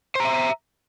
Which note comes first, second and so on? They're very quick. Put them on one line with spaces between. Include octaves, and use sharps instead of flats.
C5 A#5 E5